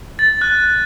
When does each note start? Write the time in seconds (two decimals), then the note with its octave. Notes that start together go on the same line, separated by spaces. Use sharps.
0.19 A6
0.41 F#6